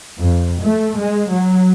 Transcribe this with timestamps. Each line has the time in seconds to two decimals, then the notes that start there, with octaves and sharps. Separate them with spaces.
0.20 F2
0.61 A3
0.99 G#3
1.30 F#3